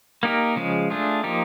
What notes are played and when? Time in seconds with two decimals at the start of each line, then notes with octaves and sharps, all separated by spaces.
0.23 A#3 D#4 G4 A#4
0.56 C#3 F3 G#3
0.90 A3 D4 F4 G#4
1.24 F3 A#3 D#4 G4